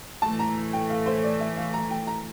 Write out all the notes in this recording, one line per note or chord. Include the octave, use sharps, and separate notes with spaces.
A2 E3 A3 A5
A#5
G5
F5
C5
D5
E5
F5
A#5
G5
A#5